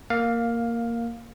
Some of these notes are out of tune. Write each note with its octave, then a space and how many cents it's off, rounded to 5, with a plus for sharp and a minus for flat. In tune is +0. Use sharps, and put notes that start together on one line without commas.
A#3 -5 F5 +10